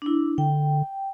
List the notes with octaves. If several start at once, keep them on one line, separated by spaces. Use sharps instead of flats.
D4 E4
D3 G5